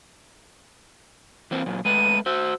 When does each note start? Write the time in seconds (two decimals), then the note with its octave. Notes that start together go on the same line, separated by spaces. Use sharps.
1.51 E3 A#3 C4
1.66 A#2 F#3
1.85 G#3 A3 B4 D#7
2.26 F#4 C5 E6